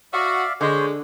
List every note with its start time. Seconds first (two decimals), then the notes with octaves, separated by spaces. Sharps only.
0.13 F#4 D5 E5 F5
0.61 D3 G#3 C5 C#5